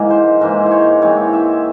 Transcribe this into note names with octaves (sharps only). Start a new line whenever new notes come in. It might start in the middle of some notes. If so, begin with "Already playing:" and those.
Already playing: G#2 E3 A#3
C5
G#2 E3 A#3 C5
C5
C#5
E3 G#3 C4 C#5
E5